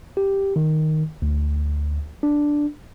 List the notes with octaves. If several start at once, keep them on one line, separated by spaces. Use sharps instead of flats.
G4
D#3
D2
D4